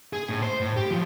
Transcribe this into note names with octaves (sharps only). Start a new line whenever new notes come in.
G#4
A2
C5
A2
G4
F3 F#3